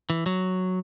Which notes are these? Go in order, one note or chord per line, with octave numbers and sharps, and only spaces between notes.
E3
F#3